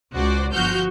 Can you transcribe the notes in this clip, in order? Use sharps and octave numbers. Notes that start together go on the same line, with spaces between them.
C#2 F#4 C5 D5
G1 F3 F#4 F6 G6